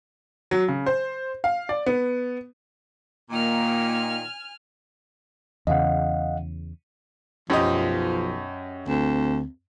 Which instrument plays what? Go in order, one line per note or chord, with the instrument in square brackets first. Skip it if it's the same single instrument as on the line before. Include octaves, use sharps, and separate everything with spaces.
[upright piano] F#3
C#3
C5
F5
D5
B3
[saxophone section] A#2 D#3 [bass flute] A#3 [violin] G#5 F6
[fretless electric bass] E2 C#3 [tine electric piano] D#5 F5 F#5
[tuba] B1 [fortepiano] F#2 G4 D#5 [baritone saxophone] F3
[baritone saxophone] D2 [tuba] C4